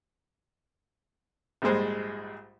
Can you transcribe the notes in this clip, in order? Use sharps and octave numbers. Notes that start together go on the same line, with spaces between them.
A#1 G#2 G3 G#3 C5